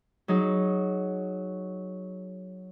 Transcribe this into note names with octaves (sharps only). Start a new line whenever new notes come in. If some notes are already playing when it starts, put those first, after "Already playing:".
F#3 D#4 G#4